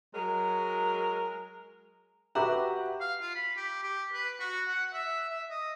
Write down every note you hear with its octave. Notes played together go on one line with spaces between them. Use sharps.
F#3 G#3 A#4
F#4 G4 B4 E5 F#5 A#5
F5
F4
B5
G4
G4
B4
F#4
F#5
E5
E5
D#5